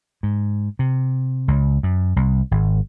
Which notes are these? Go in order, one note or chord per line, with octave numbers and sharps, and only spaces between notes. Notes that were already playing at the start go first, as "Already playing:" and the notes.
G#2
C3
C#2
F#2
C2
G#1